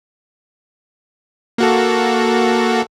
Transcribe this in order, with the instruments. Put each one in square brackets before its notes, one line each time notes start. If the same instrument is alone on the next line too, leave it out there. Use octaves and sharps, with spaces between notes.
[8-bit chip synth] A#3 F#4 A4